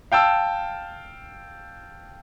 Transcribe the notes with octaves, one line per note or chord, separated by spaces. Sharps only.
F5 G5 A5 E6